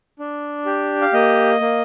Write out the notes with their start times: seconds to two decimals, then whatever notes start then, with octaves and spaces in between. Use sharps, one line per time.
0.19 D4
0.66 G4
1.02 F5
1.13 A#3 D#5
1.60 A#3